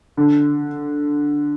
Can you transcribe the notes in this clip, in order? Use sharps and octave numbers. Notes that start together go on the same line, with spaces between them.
D3